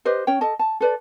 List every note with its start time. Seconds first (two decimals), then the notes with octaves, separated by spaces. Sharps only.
0.05 G4 B4 C5 D#5
0.27 C#4 C#5 G5
0.41 A4 D#5 A5
0.59 A5
0.81 A4 B4 D5